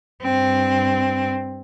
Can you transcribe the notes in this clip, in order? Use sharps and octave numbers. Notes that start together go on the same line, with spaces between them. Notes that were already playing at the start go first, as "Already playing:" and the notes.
G2 C4